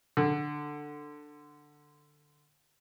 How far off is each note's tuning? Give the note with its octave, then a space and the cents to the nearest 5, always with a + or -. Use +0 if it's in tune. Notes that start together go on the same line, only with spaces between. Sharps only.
D3 +10